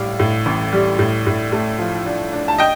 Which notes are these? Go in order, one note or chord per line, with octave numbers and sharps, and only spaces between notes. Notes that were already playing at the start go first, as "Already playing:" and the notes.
Already playing: A2 G3 D5 F5
A2
A1
G3
A2
A2
A3
F3
D4
D4
A5
D#5 G5